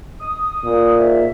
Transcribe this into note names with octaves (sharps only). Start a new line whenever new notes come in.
D#6
A#2
G#2 E5